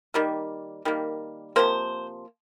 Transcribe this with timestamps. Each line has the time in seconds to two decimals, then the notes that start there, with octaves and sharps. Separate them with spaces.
0.14 D#3 G3 A#3
0.85 D#3 G3 A#3
1.56 C3 F3 A#3 C5